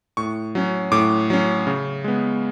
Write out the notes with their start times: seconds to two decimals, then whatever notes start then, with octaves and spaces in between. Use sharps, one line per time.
0.17 A2 C#6
0.55 F#3 C#4
0.92 A2 D6
1.30 F#3 C#4
1.67 C#3
2.04 G#3 B3